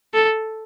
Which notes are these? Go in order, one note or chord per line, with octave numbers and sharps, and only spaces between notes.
A4